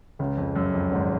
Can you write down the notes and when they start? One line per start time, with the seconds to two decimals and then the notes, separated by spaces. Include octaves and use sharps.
0.19 C#2 C#3
0.37 F2
0.56 F#2
0.74 F2
0.91 G#1 G#2